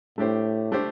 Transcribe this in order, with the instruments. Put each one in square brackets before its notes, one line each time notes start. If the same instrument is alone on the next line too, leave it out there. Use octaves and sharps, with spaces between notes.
[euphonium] A2 [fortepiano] A3 D4 G4 C5
[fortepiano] A3 D4 G4 C5